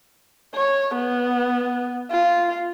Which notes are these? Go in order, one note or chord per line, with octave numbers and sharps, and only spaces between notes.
C#5
B3
F4